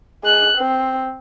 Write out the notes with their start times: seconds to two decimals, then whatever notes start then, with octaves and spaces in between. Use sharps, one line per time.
0.24 G#3 F#6
0.57 C4